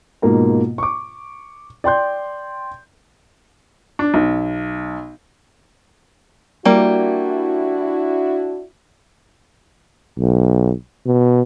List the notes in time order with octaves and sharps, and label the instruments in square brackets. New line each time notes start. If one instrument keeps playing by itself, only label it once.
[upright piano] G#2 B2 A#3 F4 A#5
C#6 D6
D5 G5 C6 G6
D4
B1
[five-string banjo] G3 A#3 [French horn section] D4 E4 F#4
[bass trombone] B1
B2